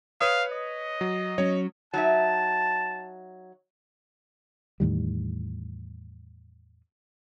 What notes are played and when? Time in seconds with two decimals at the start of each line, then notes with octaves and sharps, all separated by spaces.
0.21 B4 C#5 F5 D#6
0.52 D#5
1.01 F#3
1.38 F#3 C#4 C#5
1.94 F#3 D#4 E5 A5
4.80 E2 A2 D#3 G3